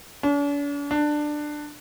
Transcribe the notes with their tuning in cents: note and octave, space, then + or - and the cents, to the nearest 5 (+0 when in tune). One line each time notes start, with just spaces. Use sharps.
D4 -45
D4 +15